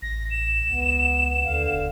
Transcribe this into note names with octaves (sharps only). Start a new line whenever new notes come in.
A1 A#6
E7
C#2 B3
D#2 D3 F5
E1